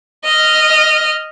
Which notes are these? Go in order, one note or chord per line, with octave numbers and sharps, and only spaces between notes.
D#5 F6